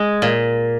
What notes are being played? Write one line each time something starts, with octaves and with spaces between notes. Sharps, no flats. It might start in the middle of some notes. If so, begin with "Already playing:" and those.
Already playing: G#3
A#2